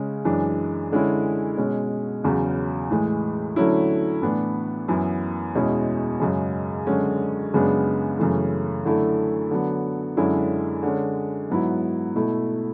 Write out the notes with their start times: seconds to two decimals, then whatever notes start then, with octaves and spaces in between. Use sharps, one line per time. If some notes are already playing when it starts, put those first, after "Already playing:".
Already playing: C#3 G#3 C#4
0.25 F#2 E3 G#3 D4
0.92 D3 G#3 C#4 E4
1.57 B2 G#3 C#4
2.24 E2 C#3 F#3
2.91 A2 E3 G#3
3.56 D3 F#3 A3 C#4 E4
4.22 A2 E3 B3 D4
4.88 F#2 E3 B3 E4
5.55 E2 B2 G#3 C#4 E4
6.20 F#2 C#3 G#3
6.87 F#2 D3 G#3 C#4
7.53 F#2 C#3 G#3 B3 D4
8.18 F#2 C#3 E3 A3
8.85 F#2 D3 A3 E4
9.51 D3 F#3 B3
10.17 F#2 D3 G#3 C#4 E4
10.83 D3 G#3 C#4
11.50 G#2 F#3 B3 E4
12.16 B2 A3 E4